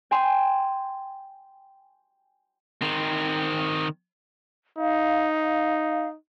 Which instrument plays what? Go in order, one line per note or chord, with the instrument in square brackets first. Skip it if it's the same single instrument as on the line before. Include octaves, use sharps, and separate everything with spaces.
[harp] G5 G#5 C6
[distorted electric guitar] D#3 C4
[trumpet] D#4 [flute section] F5